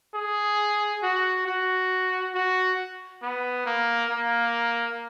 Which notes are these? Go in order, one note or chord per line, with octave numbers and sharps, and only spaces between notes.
G#4
F#4
F#4
F#4
B3
A#3
A#3